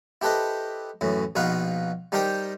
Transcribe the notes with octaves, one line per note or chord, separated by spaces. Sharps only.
E4 G4 A4 B4 C5 D#5
F#2 A2 E3
A#1 B2 D#4 F4 B4 F5
G3 D#4 G4 A#4 C5 G5